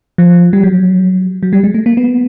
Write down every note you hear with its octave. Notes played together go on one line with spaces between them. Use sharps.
F3
G3
F#3
F#3
G3
G#3
A3
A#3
B3